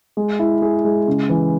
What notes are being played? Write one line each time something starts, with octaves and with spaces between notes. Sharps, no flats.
G#3
E4
G#4
G#3
C#3
E3